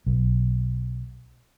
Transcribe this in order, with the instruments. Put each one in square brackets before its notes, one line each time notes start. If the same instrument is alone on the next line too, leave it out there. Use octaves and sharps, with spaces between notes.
[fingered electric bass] B1